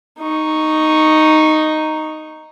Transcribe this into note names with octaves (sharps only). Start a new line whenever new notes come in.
D#4 C#6